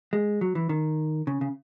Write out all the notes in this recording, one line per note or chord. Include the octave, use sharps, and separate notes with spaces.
G#3
F#3
E3
D#3
C#3
C#3